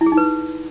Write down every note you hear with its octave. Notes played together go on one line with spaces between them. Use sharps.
E4
G#4
D#4
B4